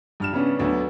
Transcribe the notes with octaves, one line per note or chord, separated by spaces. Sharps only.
G2 F6 E7
C#3 B3 C#4 D4
D2 D3 F#3 B3